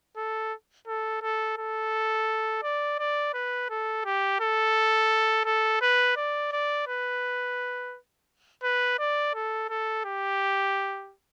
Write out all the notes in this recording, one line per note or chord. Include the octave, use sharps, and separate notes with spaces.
A4
A4
A4
A4
D5
D5
B4
A4
G4
A4
A4
B4
D5
D5
B4
B4
D5
A4
A4
G4